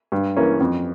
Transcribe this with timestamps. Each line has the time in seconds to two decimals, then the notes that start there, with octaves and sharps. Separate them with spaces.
0.12 G2
0.36 E3 A#3 C#4
0.60 F2